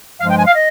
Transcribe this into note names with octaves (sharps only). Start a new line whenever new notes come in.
G2 F3 G#3 F5
G5
G#5
F5
D#5